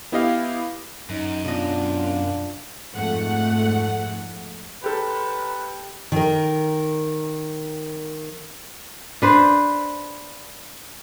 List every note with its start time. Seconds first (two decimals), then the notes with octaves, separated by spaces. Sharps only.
0.12 B3 E4 G4 D#5 F5
1.10 F#2 D#4
1.45 B1 D4 F4 D#5
2.95 F2 G#2 A3 F#5
4.84 G4 A4 B4
6.12 D#3 A#4
9.22 D4 B4 C5